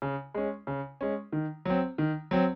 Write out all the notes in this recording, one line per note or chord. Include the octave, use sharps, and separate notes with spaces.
C#3
G#3 C#4
C#3
G#3 C#4
D#3
F#3 C4
D#3
F#3 C4